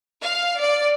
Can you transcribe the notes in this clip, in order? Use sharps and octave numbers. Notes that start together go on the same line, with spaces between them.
F5
D5